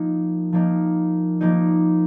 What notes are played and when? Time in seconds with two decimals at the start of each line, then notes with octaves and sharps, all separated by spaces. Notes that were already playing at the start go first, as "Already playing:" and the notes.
Already playing: F3 A#3 D#4
0.53 F3 A#3 D#4
1.41 F3 A#3 D#4